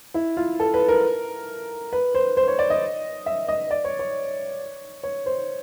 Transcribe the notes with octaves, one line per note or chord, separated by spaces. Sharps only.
E4
F4
A4
B4
A#4
B4
C5
C5
C#5
D5
D#5
E5
D#5
D5
C#5
C#5
C#5
C5